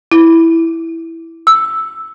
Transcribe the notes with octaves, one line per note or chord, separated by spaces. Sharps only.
E4
E6